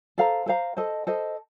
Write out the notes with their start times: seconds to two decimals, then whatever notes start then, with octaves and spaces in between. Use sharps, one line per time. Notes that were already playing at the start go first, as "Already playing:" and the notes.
0.18 A4 C5 F5 A#5
0.46 A4 C5 F5 A#5
0.77 A4 C5 D#5
1.07 A4 C5 D#5